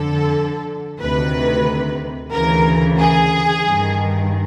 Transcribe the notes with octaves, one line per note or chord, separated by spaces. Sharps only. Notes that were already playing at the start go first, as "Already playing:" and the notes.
Already playing: F2 D3 A4
D2 C3 D#3 B4
D2 C#3 E3 A#4
G#4
G2 D#3